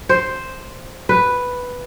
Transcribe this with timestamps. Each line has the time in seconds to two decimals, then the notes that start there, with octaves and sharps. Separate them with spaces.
0.09 C5
1.09 B4